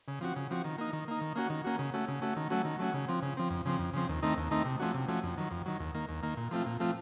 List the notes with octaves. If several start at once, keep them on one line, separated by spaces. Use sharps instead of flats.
C#3
F3 C4 F#4
C#3
F3 C4 F#4
D#3
A#3 D#4
D#3
A#3 D#4
D#3
A#3 C#4 F#4
D#3
A#3 C#4 F#4
C#3
A3 C#4 F#4
C#3
A3 C#4 F#4
D#3
F#3 A3 C#4 F#4
D#3
F#3 A3 C#4 F#4
C#3
F3 C4
C#3
F3 C4
F2
C#3 F3 C4
F2
C#3 F3 C4
D#2
D#3 A3 C4 D#4
D#2
D#3 A3 C4 D#4
C3
F3 A3 C#4 F#4
C3
F3 A3 C#4 F#4
F2
D#3 F#3
F2
D#3 F#3
D#2
D#3 A#3
D#2
D#3 A#3
A#2
F3 A3 C4 F4
A#2
F3 A3 C4 F4